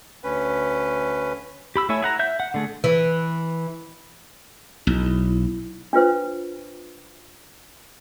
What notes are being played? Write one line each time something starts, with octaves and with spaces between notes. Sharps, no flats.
D2 C#4 B4
G4 B5 E6
A3 E4 C#5 E5 G#5
E4 G#4 F#5 A#5
E5 G6
F#5
D3 A3 G#4
E3
B1 E4
D4 F4 B4 C5